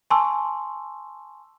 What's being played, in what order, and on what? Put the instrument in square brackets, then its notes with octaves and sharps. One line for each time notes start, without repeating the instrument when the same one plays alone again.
[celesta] G#5 A5 C6 C#6 E6